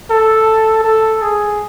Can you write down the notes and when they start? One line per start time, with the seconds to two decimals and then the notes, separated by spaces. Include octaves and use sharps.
0.10 A4
0.84 A4
1.22 G#4